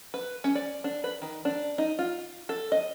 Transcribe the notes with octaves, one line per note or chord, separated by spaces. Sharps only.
B4
C#4
D5
D4
B4
D#3
D4
D#4
F4
A4
D#5